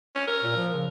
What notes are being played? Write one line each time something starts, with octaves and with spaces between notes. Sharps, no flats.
C#4
A#4
A#2
F3
C#3